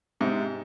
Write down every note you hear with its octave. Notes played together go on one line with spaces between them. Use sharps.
G#2 C3